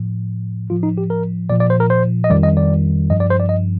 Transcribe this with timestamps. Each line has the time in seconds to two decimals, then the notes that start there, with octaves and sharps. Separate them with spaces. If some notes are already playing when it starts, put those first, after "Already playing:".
Already playing: A2 F3
0.70 A2 F3 F4
0.83 D#4
0.98 G4
1.10 A#4
1.50 A#2 F3 D5
1.60 D5
1.70 C5
1.80 A#4
1.90 C5
2.24 D#5
2.30 F2 D#3 G3 D5
2.43 D#5
2.57 D5
3.10 G2 F3 D#5
3.20 D5
3.30 C5
3.40 D5
3.49 D#5